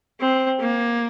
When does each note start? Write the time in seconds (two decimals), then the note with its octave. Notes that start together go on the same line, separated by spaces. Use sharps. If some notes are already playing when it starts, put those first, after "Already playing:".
0.20 C4
0.60 A#3